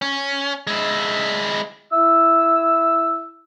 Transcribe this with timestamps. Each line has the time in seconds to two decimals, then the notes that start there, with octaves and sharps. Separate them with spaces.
0.02 C#4
0.67 G#3 E4
1.93 E4 E6